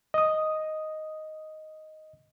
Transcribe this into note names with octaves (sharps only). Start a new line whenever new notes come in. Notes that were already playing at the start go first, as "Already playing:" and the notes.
D#5 D#6